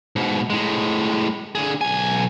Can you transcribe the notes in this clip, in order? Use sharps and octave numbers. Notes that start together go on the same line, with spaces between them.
G#2 B2
A2 G#3
D3 G#4
B1 G#5